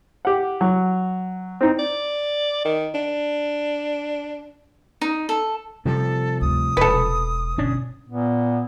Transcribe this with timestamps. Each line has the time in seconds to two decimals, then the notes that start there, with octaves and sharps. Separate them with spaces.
0.25 G4 F#5
0.61 F#3
1.61 C4 D#4
1.79 D5
2.65 D#3
2.95 D4
5.01 D#4
5.29 A4
5.85 C3 F3 G3 A4
6.41 D2 G2 D#6
6.77 E1 G#3 A4 B4
7.58 G1 B2 C#4 D4
8.09 A#2 B3